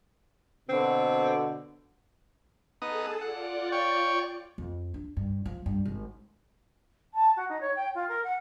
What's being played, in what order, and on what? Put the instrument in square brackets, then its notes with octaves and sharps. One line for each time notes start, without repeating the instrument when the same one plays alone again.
[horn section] B2 D3 [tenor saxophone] C4
[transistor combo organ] B3 D#4 D#6 [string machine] G#4 A4 A5
[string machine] F4 D5 [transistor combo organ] F#5
[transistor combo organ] C#5 G5 C#6
[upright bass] F2
D4
G2
F3
G2
G#1
[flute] A5
F#4
D#4
C#5
G5
F4
A#4
F#5